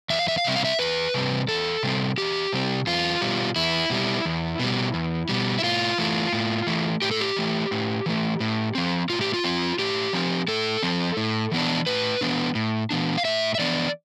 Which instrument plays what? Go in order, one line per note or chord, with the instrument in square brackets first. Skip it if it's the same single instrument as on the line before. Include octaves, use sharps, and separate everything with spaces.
[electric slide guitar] E2 E5
F5
E5
F5
C3 G3 C4 E5
F5
E5
E2 B4
C3 G3 C4
E2 A4
C3 G3 C4
E2 G4
C3 G3 C4
E2 F4
B2 G3
E2 E4
B2 G3
E2
B2 G3
E2
B2 G3
E4
A2 F4
E3 A3
A2
E3 A3
A2 G4
A4
G4
E3 A3
A2
E3 A3
A2
F3 C4
A2 F4
G4
F4
F3 C4
A2 G4
F3 C4
A2 A4
F3 C4
A2
E3 B3 D4
A2 B4
E3 B3 D4
A2
E3 B3 D4
F5
A2 E5
E5
E3 B3 D4 D5